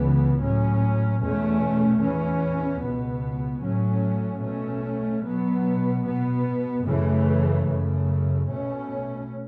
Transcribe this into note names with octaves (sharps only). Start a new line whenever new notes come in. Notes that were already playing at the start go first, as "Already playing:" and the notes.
Already playing: C#2 C#3 E3 B3
A2 F#3 C#4
E2 B2 A3 C#4
E2 E3 C#4
C#2 B2 B3
A2 F#3 A3 C#4
B2 A3 C#4
B2 F#3 B3
B2 B3
F#2 C#3 E3 A3
F#2 C#3 A3
B2 A3 C#4